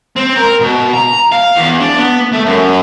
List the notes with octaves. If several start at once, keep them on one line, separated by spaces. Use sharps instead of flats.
C4
A#4
B2
A#5
F5
E2
D4
B3
A3
F#2